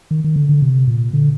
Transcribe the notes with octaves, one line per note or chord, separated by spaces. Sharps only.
D#3
D#3
D3
D3
C3
A#2
D3